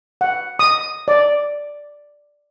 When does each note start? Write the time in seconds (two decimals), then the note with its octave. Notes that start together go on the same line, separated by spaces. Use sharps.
0.21 F#5
0.59 D#6
1.08 D5